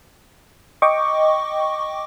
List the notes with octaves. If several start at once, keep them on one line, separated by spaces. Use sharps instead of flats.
D#5 G5 C#6 D6